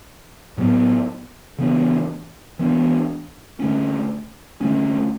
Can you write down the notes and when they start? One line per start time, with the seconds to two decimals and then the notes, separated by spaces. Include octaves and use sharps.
0.57 A2 F#3 B3
1.58 C#3 E3 B3 D4
2.59 E3 B3 D4
3.60 D3 A3 C#4
4.61 D3 A3 C#4